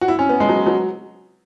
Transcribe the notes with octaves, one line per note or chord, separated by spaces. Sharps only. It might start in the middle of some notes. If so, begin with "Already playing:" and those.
F#4
E4
C#4
B3
G#3
F#3
F#3